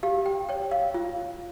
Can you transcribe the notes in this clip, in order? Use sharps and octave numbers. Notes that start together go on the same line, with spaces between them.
G4 F5
G5
C#5 G5
F5
F4